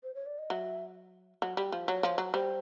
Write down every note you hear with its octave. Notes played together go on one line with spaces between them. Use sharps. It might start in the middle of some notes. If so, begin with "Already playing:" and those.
C5
C#5
D5
D#5
F#3 E5
F#3
G3
F3
F#3 C#5
F3
F#3
G3 C5